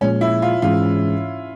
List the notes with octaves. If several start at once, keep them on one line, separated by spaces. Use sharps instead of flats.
A#2 F3 G#3 C#4
E4
F4
G#2 E3 G#3 C#4 F4